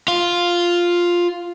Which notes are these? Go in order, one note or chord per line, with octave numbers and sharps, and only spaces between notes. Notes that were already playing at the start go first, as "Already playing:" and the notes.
F4